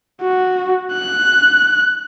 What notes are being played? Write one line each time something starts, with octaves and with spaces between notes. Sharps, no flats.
F#4
F#6